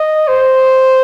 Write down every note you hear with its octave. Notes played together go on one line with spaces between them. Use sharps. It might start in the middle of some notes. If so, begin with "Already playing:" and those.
Already playing: D#5
C5